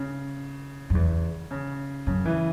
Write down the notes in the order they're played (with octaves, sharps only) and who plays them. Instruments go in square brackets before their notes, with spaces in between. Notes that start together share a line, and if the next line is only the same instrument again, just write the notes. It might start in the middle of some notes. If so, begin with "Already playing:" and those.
Already playing: [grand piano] C#3
[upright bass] F#2
E2
[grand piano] C#3
[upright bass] F#2 [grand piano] C#3
[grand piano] E3